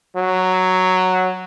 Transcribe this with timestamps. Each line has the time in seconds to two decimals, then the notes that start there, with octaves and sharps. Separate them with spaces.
0.16 F#3